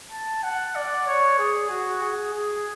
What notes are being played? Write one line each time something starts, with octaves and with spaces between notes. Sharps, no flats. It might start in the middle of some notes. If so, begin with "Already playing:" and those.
A5
F#5
D5
C#5
G#4
F#4
G#4
G#4